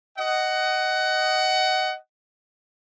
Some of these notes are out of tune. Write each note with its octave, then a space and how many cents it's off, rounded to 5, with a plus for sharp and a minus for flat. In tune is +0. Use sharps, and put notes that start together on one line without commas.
D#5 +0 F#5 +20